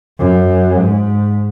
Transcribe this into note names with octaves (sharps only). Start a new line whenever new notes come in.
F#2
G#2